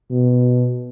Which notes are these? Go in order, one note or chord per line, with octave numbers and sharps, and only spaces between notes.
B2